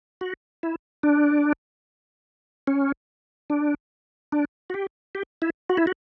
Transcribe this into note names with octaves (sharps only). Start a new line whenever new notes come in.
F#4
E4
D4
C#4
D4
D4
F#4
G4
G4
E4
F#4
E4
F#4